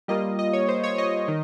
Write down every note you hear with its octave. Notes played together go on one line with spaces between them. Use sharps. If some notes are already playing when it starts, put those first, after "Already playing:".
G3 A#3 F4 D#5
D#5
C#5
C5
C#5
D#5
D#3